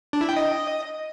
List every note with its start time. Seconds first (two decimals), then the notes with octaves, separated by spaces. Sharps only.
0.13 D4
0.21 E4
0.29 G5
0.36 D#5